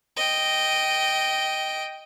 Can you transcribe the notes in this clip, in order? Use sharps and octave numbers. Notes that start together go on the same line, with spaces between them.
D#5 G5